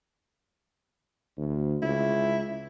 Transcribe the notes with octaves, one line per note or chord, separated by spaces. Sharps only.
D2
C#2 E4